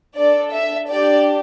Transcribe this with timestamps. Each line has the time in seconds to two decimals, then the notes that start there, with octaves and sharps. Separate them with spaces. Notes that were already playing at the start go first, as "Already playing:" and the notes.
0.16 D4 A4 D5
0.53 E5
0.90 D4 G4 D5